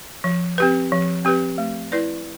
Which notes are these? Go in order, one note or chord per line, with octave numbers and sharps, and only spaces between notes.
F3
C4 G4 B4
F3
C4 G4 B4
A3
E4 B4 D5